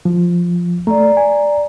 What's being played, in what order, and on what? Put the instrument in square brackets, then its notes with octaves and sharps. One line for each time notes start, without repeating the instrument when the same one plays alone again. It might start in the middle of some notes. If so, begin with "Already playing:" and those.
[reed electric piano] F3
[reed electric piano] A3 [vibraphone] D5 A#5
[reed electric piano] G#5